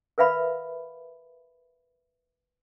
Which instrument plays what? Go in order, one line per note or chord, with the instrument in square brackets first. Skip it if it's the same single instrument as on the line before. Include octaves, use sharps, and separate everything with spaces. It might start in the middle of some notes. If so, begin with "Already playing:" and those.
[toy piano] A#4 B4 E5 F5 B5